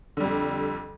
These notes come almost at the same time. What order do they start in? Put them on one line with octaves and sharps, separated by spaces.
D3 G3 F2